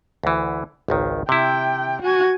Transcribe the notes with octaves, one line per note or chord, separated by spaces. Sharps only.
D2 E3
G#1 C#2 D#3
C3 E4 G5
F#4 G#5